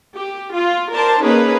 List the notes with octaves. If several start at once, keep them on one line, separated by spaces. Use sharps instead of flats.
G4
F4
A#4 C5 D5 A5
A#3 C#4 D#4 G#4 B4